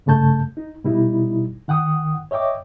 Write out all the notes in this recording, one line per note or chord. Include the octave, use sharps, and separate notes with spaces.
G2 C#3 A3 A5 G6
D#4
B2 G3 D#4 E4
D#3 F#5 G5 D#6
C#5 D#5 E5 G5 D6